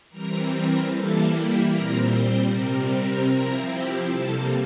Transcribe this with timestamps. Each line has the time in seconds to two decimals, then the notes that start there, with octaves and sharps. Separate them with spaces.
0.10 E3 G3 C4 A#4 A#5
0.49 A#4 A#5
0.89 E3 G3 A#3 E4 A4 A5
1.29 G4 G5
1.68 A#2 G3 C4 A#4 A#5
2.08 C5 C6
2.47 C3 G3 C4 A#4 A#5
2.87 A#4 A#5
3.26 F3 C4 E4 A#4 A#5
3.65 G4 G5
4.05 C3 G3 A#3 A4 A5